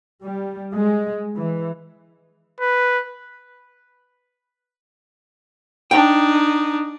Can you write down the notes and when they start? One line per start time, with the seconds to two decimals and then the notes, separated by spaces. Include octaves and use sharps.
0.23 G3
0.74 G#3
1.36 E3
2.61 B4
5.91 D4 D#4 G5